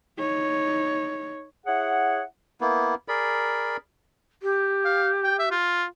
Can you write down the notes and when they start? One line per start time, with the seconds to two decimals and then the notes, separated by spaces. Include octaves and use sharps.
0.19 D#4 C#5
1.66 E4 G#4 C#5 F#5
2.61 A#3 B3 E4
3.08 G#4 A#4 D5 B5
4.42 G4
4.85 F5
5.24 G5
5.39 E5
5.51 F4